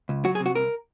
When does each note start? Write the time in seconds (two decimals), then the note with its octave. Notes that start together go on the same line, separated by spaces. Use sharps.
0.09 C#2
0.25 F#3 F#4
0.35 G#4
0.40 C3
0.46 F#4
0.55 C2 A#4